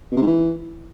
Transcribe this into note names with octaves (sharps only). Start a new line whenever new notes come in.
B2
C3
G#2
E3